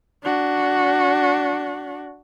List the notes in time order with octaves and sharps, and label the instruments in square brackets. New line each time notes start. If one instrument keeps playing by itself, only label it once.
[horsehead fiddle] D4 F#4